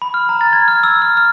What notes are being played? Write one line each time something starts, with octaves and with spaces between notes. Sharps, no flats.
B5
F6
A#5
A6
G#6
F6
E6
F6
F6